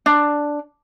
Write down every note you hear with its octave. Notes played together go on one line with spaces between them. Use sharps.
D4